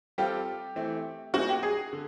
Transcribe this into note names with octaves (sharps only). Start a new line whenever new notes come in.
G3 C4 F4 G4 A4
E3 A3 C4
A#3 D#4 F#4 G#4 C5
G4
G#4
D3